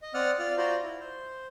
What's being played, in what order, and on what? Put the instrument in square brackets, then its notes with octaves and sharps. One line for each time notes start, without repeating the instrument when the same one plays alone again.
[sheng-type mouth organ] D#5
C4 D5 F#5 D#6 F6
F4 D5 F6
F4 F#4 C5 D5 A#5
E4
C5